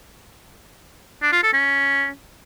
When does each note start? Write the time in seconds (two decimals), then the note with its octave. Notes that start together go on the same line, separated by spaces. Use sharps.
1.22 D4
1.32 F4
1.43 A4
1.54 C#4